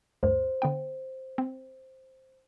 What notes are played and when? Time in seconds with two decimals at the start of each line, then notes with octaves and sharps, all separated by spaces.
0.23 D2 G2 C5
0.62 D3 B3 G5
1.38 C4